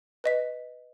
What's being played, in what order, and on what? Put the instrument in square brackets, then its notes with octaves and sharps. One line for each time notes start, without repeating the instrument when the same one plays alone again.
[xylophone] B4 D#5 B6